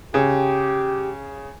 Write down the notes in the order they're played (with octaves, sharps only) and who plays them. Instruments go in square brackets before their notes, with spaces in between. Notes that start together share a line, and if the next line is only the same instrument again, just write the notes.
[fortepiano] C#3 [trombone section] G4